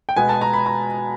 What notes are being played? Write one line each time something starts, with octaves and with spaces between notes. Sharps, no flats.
G5
B2 G#3 B3 G#5
A5
A#5
B5
A#5